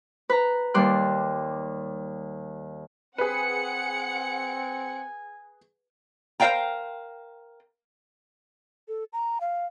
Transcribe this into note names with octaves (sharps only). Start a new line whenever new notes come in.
B4 A#5
D#2 G3 D5 C6 F#6
C4 G#4 B4 F#5 G#5 C#7
A#4 C5 E5 F5 G5 A#5
A4
A#5
F5